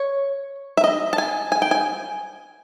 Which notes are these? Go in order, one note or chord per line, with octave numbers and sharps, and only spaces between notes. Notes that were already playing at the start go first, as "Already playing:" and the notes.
Already playing: C#5
E5
D#5
A5
G#5
G#5
G5
G#5